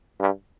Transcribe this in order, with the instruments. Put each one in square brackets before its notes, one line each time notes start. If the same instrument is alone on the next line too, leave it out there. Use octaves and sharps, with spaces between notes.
[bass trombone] G2